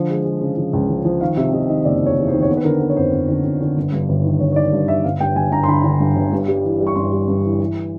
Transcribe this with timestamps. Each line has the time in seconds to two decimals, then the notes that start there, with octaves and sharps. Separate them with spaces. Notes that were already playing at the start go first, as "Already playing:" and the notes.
Already playing: D3 F3
0.09 G#3
0.25 G#3
0.41 C#3
0.57 F3
0.73 C#2
0.89 F3
1.05 F3
1.21 D#3 F5
1.37 C3 E5
1.52 C3 D#5
1.69 D#3 D#5
1.85 F#1 D5
2.01 E2
2.06 C#5
2.17 E2
2.28 C5
2.33 D#3
2.42 C#5
2.49 B3 C5
2.57 B4
2.65 D3 A#4
2.80 B3 B4
2.90 C#5
2.96 F2 C5
3.12 F2
3.28 D3
3.44 F2
3.61 D3
3.77 G1
3.92 G2
4.09 G1
4.24 D#3
4.40 G1 C#5
4.52 C#5
4.56 D#3 D5
4.73 G2
4.88 G1 E5
5.04 G1 F5
5.20 G2 G5
5.36 G1 G#5
5.52 G2 A#5
5.63 C6
5.68 D3 B5
5.84 D3
6.00 G2
6.16 G1
6.33 G2
6.48 G3
6.64 E3
6.80 G3
6.87 C#6
6.96 G2 C6
7.12 G3
7.28 G2
7.44 E3
7.60 E3